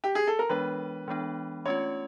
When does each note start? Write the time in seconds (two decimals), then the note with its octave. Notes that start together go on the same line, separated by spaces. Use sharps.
0.04 G4
0.15 G#4
0.27 A4
0.39 A#4
0.49 E3 G#3 B3 D4 B4
1.08 E3 G#3 B3 D4
1.66 A3 C#4 F4 C#5